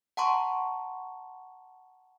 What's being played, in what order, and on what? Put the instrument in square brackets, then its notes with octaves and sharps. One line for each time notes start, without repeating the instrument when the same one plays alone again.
[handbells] F#5 A5 A#5 C6 C#6